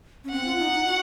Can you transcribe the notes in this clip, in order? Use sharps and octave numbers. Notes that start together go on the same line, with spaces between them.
C#4
C4 F#5
F4
D#4
D#4
F4
F#4